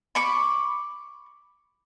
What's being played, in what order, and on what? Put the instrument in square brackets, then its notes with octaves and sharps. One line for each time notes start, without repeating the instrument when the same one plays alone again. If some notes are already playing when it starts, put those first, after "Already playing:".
[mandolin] B5 C#6 D6